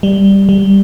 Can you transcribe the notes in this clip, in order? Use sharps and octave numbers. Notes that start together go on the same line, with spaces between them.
G3
G3